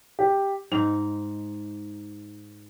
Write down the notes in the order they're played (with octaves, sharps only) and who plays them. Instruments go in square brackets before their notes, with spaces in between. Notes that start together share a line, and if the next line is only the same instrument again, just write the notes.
[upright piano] G4
[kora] G#2 D#4 [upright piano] F7